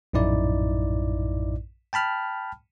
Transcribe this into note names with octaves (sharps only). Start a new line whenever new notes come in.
A#1 F#2 A2 D#4 E4 D5
G5 A5 B5 F6